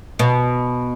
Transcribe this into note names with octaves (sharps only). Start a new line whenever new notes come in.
B2